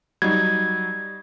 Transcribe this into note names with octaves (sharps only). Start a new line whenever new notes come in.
F#3 G3 D#4 G#6